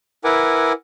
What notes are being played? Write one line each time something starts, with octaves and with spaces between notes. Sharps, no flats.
E4 A#4 B4 F#5 G#5 D6